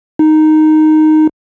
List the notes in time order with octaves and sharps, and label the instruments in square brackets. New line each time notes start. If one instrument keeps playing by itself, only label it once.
[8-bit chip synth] D#4